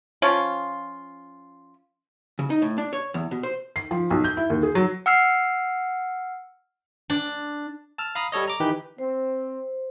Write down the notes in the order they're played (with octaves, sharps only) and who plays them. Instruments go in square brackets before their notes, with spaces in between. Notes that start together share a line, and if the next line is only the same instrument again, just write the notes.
[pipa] F3 C#4 F4
[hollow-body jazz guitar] C#3
D#4
A2
D4
C#5
E2
B2
C5
[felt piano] C7
F3
B1
G6
E4
D#2
G#4
F#3
[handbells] F#5 E6 F6 C7
[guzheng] D4
[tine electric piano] A5 E6 F6
F5 A#5 B5 D#6
G3 A4 C#5 D#5
A#5 D6
D#3 E3 D#4 G4 B4
[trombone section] C4 [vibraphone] C5